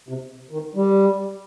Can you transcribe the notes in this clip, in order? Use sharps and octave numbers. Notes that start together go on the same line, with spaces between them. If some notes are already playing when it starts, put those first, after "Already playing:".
C3
D#3
G3